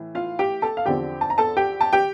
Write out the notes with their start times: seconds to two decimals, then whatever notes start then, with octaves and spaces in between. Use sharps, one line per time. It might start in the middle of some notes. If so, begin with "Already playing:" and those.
Already playing: A2 E3
0.15 F4 F5
0.39 G4 G5
0.62 A4 A5
0.77 F5
0.86 E2 D3 F3 C4 G4 G5
1.21 A5
1.30 A#5
1.38 A4 A5
1.57 G4 G5
1.81 A5
1.93 G4 G5